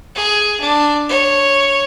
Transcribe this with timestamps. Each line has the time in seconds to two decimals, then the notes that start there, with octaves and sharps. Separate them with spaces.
0.15 G#4
0.60 D4
1.09 C#5